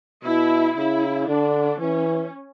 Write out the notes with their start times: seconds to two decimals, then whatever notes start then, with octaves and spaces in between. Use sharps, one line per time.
0.25 B2 E4
0.77 C#3 E4
1.28 D3 D4
1.81 E3 C#4